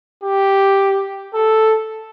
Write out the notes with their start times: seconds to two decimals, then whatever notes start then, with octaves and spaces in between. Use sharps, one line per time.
0.23 G4
1.34 A4